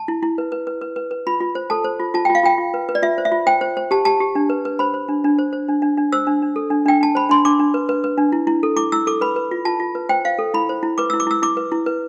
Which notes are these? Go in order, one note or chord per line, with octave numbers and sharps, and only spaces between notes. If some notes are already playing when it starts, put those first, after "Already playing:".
Already playing: A5
E4
E4
B4
B4
B4
B4
B4
B4
F4 B5
F4
C5
A4 A5
C5
F4
F4 A5
F4 G5
F5
F4 G5
F4
B4
B4
D5
F4 E5
C5
E5
F4
C5 G5
C5
C5
G4 A5
G4 A5
G4
D4
B4
B4
C5 B5
C5
D4
D4
C5
C5
D4
D4
D4
C5 E6
D4
D4
A4
D4
D4 G5
D4 A5
C5 B5
D4 C6
D4 D6
D4
B4
B4
B4
D4
E4
E4
A4
E4 D6
E4 E6
A4 D6
B4 B5
B4
F4
F4 A5
F4
B4
C5 G5
C5 F5
A4
E4 B5
C5
E4
B4 D6
E6
E4
D6
E4 E6
E4 D6
B4
E4
B4